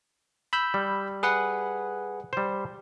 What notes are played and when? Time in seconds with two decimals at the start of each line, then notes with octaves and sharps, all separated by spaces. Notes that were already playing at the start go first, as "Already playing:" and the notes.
0.53 B5 E6 G6
0.74 G3
1.23 G#4 B4 F#5
2.33 G3 C5